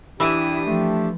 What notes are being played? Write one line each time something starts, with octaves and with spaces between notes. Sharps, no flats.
E3 D4 E4 G4 E5 D#6
F3 A3